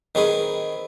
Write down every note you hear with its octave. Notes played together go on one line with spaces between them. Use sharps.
D#3 C4 G#4 B4